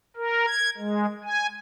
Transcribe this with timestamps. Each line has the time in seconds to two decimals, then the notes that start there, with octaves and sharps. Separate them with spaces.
0.16 A#4
0.47 G#6
0.77 G#3
1.24 G#5